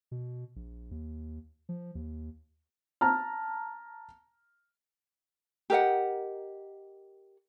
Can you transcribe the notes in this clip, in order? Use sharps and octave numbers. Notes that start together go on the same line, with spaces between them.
B2
A#1
D#2
F3
D#2
A5 A#5 F6
G4 A#4 D#5 F#5